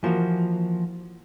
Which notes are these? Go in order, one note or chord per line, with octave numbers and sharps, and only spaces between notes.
E3 F3 A#3 F#4